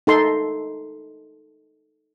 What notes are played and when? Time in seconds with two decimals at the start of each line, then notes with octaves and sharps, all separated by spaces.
0.07 D#4 A4 C6